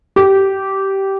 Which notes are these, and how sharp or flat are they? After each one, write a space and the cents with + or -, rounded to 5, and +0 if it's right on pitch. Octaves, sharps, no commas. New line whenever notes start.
G4 -15